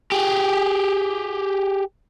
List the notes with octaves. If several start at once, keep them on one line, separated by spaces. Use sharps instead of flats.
G4 G#4